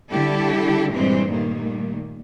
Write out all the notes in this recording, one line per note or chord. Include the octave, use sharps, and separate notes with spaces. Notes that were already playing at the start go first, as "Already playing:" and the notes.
D3 G3 E4 G4 A4
G2 A#2 E3 G3 G#3 C4
A#2 D#3 G3 A3 A#3